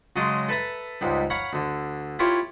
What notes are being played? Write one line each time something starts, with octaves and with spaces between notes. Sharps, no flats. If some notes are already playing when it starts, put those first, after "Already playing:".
C#3 F#3 G#3 D#5 A5 C6
A4 B4 E5 A5 A#5
C#2 G#2 G3
C#5 F5 F#5 A#5 B5
D2 D3
E4 F4 G4 A#4 C#5 C6